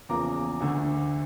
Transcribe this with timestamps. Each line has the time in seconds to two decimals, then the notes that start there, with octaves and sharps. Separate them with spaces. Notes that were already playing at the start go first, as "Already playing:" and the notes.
0.09 E2 C#3 F3 A#3 A#5 D6
0.60 D2 D3 A3